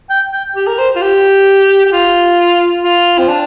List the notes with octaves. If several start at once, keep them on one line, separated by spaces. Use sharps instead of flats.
G5
G5
G4
A#4
C5
F4
G4
G4
F4
F4
C4
D4